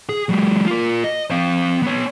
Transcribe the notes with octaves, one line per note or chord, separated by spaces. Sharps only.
G#4
F#3 G#3
F4 A#4
D#5
C4 F5
B3 C#5